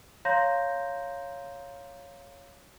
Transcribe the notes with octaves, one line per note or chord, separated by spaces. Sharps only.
C#5 F5 A#5 C6 G6 A#6